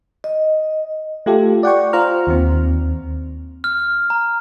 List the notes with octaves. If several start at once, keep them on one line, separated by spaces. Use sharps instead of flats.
D#5
A3 F4 G4 A4
D5 F#5 G5 C#6
F4 C5 A#5 F6
D#2 D#3 C4
F6
A#5